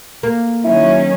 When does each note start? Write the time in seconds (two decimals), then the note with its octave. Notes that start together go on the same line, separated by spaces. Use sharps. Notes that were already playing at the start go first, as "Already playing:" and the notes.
0.23 A#3
0.64 D#3 F#3 C#4 E4